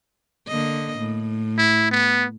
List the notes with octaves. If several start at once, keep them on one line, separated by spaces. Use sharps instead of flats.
D3 A#3 D#5
A2
E4
B3